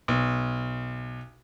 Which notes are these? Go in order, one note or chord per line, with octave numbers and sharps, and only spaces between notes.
B1